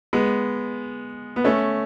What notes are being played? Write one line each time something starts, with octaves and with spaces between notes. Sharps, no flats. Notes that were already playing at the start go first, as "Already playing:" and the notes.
G#3 B3
B3
A3 C#4